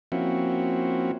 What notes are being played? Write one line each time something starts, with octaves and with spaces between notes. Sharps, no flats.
F3 A#3 C4 C#4 E4 F#4